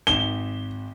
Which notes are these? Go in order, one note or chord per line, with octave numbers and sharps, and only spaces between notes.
G#1 E7 G7